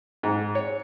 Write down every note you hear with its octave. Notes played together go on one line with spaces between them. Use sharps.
G#2
C#5